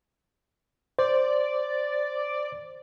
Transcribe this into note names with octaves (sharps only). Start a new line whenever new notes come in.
C5 D5